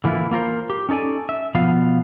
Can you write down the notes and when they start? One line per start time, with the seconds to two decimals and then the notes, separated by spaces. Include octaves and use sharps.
0.04 D3 E3 A#3 E4 F4
0.31 A#3 F4 A#4 C5
0.70 G4
0.89 C#4 D#4 A4 D5 G#5
1.29 E5
1.55 B2 F3 B3 F4 F5